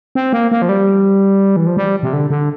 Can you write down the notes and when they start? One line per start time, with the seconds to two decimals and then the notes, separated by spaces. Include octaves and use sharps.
0.15 C4
0.33 A#3
0.51 A#3
0.62 F3
0.69 G3
1.56 E3
1.67 F3
1.77 G3
2.03 C3
2.13 D3
2.30 D3